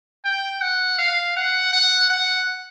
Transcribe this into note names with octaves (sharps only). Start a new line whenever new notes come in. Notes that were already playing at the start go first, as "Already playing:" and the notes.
G5
F#5
F5
F#5
F#5
F#5